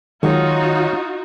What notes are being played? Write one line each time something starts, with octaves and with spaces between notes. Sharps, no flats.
D#3 F#3 G#3 D#4 F4 F#4 C#5